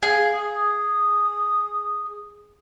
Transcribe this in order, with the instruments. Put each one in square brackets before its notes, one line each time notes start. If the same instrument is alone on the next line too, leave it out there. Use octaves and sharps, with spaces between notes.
[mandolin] G#4 [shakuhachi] F5
[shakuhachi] D#6